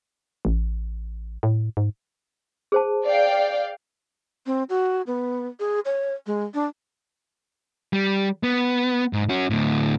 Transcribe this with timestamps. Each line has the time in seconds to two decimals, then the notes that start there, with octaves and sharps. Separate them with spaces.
0.45 A1
1.43 A2
1.77 G#2
2.72 G#4 C5 A5
3.06 D5 F5 G5
4.46 C4
4.70 F#4
5.07 B3
5.60 G#4
5.85 C#5
6.27 G#3
6.54 D4
7.93 G3
8.43 B3
9.13 G#2
9.29 C#4 F#4
9.50 D2 A2